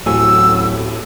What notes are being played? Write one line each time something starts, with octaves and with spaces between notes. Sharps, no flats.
D1 A1 F#2 A2 C#4 G#5 E6